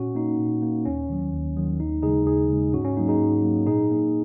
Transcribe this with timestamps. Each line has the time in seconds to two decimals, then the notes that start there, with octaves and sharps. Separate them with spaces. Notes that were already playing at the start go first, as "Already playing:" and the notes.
Already playing: A#2 C#4 F#4
0.15 A#3 D#4
0.39 A#2
0.62 A#3
0.85 D#2 C#4
1.09 D#3 F#3
1.33 D#2
1.57 D#3 F#3
1.80 D#2 D#4
2.03 C#3 G#3 D#4 G#4
2.26 D#2 D#4 G#4
2.49 C#3 G#3
2.73 G#2 C#4 F#4
2.85 C#4
2.97 F#3 A#3 D#4
3.08 D#4 G#4
3.20 G#2
3.43 F#3 A#3
3.67 A#2 D#4 G#4
3.91 A#3